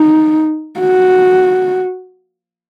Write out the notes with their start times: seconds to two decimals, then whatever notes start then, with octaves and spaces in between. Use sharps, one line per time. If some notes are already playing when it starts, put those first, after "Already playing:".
Already playing: D#4
0.80 F#4